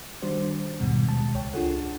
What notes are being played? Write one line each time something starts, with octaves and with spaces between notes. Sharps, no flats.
D#3 G3 D4 F#4 C5
D#2 G#2 B2 D#3 G3
B2 G#3 A5
C#2 C#5 G5
D4 F4 G#4 A4 F#5